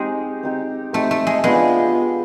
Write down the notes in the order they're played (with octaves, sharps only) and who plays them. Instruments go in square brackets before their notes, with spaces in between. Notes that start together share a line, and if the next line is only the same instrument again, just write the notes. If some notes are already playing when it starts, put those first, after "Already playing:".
Already playing: [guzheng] G#3 [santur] C4 D#4 G4
[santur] C4 D#4 G4
[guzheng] A3 [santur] C4 D#4 G4
[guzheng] A3
G#3
[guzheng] G#3 [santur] B3 D4 F4